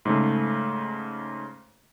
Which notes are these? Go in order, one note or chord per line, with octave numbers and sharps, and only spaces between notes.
G#2 C#3 A3